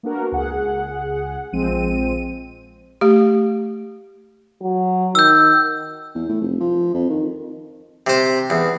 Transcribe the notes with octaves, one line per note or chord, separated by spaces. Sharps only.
A#3 B3 D4 F#4 A#4
C#2 G#4 F#5
A#1 F3 G#3 C4 D#7
A3 G4
F#3
D#3 E6 G6
E2
A2
F1
F3
F2
D#3
C3 C5
E2